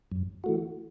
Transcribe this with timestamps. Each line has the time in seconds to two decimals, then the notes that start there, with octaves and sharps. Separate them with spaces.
0.12 F#2
0.44 E3 A3 F#4